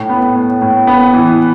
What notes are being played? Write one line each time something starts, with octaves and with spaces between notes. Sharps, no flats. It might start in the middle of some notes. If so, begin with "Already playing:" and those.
Already playing: A2
B3
A2
A2
B3
E3